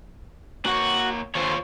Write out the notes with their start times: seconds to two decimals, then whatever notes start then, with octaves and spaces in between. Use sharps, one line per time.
0.65 A#3 F#4 C#5
1.35 D#2 F4 C5 C#5